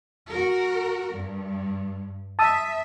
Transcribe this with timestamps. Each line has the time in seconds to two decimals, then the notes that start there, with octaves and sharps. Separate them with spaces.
0.28 F#4 A#4
1.12 G2
2.39 E5 A5 D#6 E6